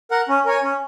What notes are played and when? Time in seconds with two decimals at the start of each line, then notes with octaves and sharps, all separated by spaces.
0.11 A#4 F#5
0.29 C#4
0.46 A#4 C#5 G#5
0.63 C#4